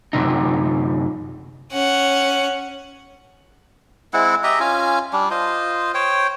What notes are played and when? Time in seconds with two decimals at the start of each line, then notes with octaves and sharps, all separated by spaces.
0.13 F#2 C3 D#4
1.72 C#4 F#5
4.13 G#3 C4 E4 F#5
4.44 G4 D#5 E5 A#5
4.60 C#4 F4 G#5
5.13 G3 D4
5.31 F4 C5 D#5
5.94 C5 C#5 G5